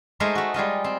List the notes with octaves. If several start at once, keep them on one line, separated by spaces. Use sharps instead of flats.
G#3 A3 D#4 A#4 C5 D#5
A3 F#4
G3 G#3 F4 D#5
C4